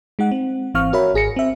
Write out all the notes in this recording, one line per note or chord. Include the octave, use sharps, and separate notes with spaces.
G#3 D#4 F#5
C4
G#1 E3 C4 F5 C#6 F6
F#4 A#4 C#5 E5 B5
G#1 G#4 A#6 C#7
C4 E5